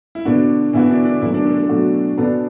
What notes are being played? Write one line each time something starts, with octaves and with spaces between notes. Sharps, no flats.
E4
B2 D3 B3 D4 F#4
B2 E3 B3 E4 F#4
D3 D4
D3 D4
B2 E3 F#3 A3 E4 F#4
D3 D4
D3
D3
B2 F#3 A3 F#4
B2 B3 D4 A4